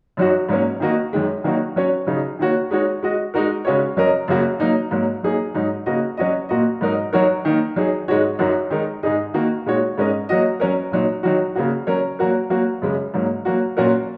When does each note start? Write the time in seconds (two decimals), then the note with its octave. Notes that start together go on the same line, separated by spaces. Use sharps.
0.17 F#2 F#3 D#4 F#4
0.49 G#2 F#3 A#3 C#4
0.80 D#3 A#3 F#4 D#5
1.13 F#2 D#3 G#3
1.44 D#3 F#3 A#3 D#4 F#4
1.76 F#3 C#4 F#4 C#5
2.07 C#3 F#3 D#4
2.39 D#3 A#3 F#4 C#5
2.71 G#3 D#4 F#4 C#5
3.03 G#3 F#4 D#5
3.34 G#3 D#4 F#4 A#4
3.65 C#3 G#3 C#4 F#4 C#5
3.97 F#2 F#3 C#4 A#4 D#5
4.28 F#2 C#3 A#3 F#4
4.60 F#3 A#3 D#4
4.91 G#2 F#3 A#3
5.23 F#3 A#3 D#4 G#4
5.54 G#2 F#3 D#4
5.86 C#3 A#3 F#4 D#5
6.17 F#3 C#4 F#4 D#5
6.49 A#2 A#3 F#4 D#5
6.81 G#2 F#3 D#4 A#4 D#5
7.13 F#3 D#4 F#4 A#4 C#5
7.45 D#3 A#3 D#4
7.76 F#3 D#4 G#4
8.08 G#2 G#3 D#4 F#4 C#5
8.39 F#2 F#3 D#4 F#4 A#4
8.70 D#3 G#3 D#4 A#4
9.03 G#2 G#3 D#4 G#4 D#5
9.34 D#3 A#3 F#4
9.66 A#2 G#3 D#4 F#4 C#5
9.98 G#2 G#3 C#4 A#4 D#5
10.29 F#3 A#3 F#4 D#5
10.60 F#3 C#4 A#4
10.92 A#2 F#3 D#4
11.23 D#3 F#3 D#4 F#4
11.55 C#3 A#3 F#4
11.87 F#3 C#4 A#4 C#5
12.19 F#3 A#3 F#4 A#4
12.50 F#3 A#3 F#4
12.82 F#2 C#3 G#3
13.14 G#2 F#3 A#3
13.45 F#3 A#3 F#4
13.77 A#2 F#3 C#4 F#4 A#4